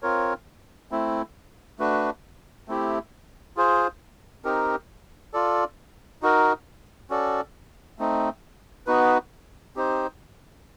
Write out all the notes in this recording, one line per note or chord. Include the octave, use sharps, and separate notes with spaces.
C4 F4 A#4 C#5
A3 C4 E4
A3 D4 F#4 B4
A3 C4 E4 G4
F4 G#4 C5
C4 D#4 G4 A#4
F4 A4 D5
D#4 F#4 A#4
C#4 F#4 A4 D5
A3 C4 D#4
B3 D#4 F#4 B4
C4 D#4 G4 C5